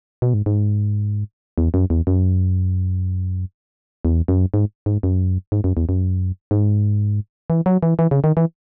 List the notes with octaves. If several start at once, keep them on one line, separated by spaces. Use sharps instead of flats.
B2
G#2
G#2
E2
F#2
E2
F#2
E2
F#2
G#2
G#2
F#2
G#2
F#2
E2
F#2
G#2
E3
F#3
E3
E3
C#3
D#3
E3